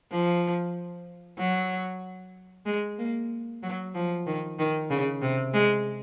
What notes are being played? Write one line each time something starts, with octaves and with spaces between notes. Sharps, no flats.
F3
F#3
G#3
A#3
F#3
F3
D#3
D#3
C#3
C3
G#3